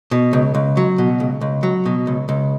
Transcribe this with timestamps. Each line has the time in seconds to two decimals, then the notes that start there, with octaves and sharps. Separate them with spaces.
0.11 B2
0.33 C#2
0.55 C#2
0.77 F#3
0.98 B2
1.20 C#2
1.41 C#2
1.63 F#3
1.86 B2
2.07 C#2
2.29 C#2